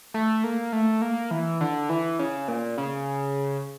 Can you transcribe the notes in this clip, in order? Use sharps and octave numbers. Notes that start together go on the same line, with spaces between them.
A3
A#3
A3
A#3
E3
D3
E3
C#3
A#2
C#3